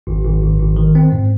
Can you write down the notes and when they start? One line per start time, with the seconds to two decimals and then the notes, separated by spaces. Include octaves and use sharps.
0.07 G#1
0.24 G#1
0.42 G#1
0.60 G#1
0.76 D#3
0.95 C4
1.12 G#2